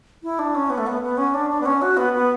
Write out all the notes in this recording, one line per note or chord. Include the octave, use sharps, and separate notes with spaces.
E4
D4
C#4
B3
A3
B3
B3
C#4
D4
D4
B3
C#4
F#4
B3
B3